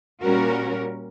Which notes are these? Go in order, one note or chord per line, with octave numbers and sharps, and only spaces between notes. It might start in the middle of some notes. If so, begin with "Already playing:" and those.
A#2 G3 C#4 F#4 A#4